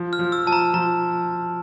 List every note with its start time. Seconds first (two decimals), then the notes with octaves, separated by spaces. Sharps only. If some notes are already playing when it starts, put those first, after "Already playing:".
Already playing: F3
0.13 F6
0.19 F3
0.32 E6
0.46 F3 A5
0.53 A#5
0.74 F3 A#5